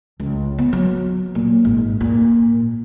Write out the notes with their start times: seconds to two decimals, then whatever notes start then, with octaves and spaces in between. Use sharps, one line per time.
0.20 C#2
0.59 B3
0.73 F#3
1.35 A#2
1.65 G#1
2.01 A#2